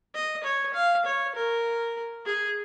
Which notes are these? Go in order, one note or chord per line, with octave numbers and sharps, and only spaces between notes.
D#5
C#5
F5
C#5
A#4
G#4